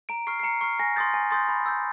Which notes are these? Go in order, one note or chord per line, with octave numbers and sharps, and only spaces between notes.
A#5 D7
C#6 F6 C7
C7
A#5 C#7
C#6 F6 C7
G#5 A#6
C6 D#6 G6 A6
G#5
C6 D#6 G6 A6
B5
E6 G6